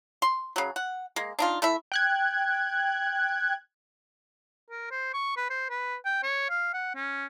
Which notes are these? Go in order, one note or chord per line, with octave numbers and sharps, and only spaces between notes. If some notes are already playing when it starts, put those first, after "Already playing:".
C6
C#3 F#3
F#5
G#3 A#3
D4 D#4 F4
A3 E4 E5
G5 F#6 G#6
A#4
C5
C#6
B4
C5
B4
G5
C#5
F5
F#5
C#4